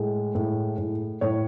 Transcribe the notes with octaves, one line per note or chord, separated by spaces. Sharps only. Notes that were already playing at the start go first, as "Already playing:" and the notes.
Already playing: A2 G#3
A2
A2
A2 C#5